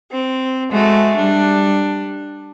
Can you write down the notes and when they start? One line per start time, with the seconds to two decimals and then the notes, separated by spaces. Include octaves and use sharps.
0.12 C4
0.71 G#3 A3 F#4
1.16 G3 D4